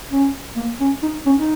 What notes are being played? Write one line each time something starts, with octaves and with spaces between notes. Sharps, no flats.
C#4
A#3
C#4
D#4
C#4
D#4